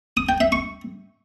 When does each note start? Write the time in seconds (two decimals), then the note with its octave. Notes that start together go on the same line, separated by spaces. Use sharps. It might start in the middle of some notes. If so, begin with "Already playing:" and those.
0.17 D#6
0.29 G5
0.40 E5
0.52 C#6